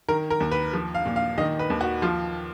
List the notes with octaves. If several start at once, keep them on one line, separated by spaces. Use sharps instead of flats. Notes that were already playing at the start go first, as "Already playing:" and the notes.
D#3 A#4
A#4
D#2
B4
F3
F5
A#2
F5
D#3 D#5
B4
D#2
F#4
F3 F4